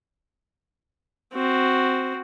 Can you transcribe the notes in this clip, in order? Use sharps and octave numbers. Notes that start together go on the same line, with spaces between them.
C4 F#4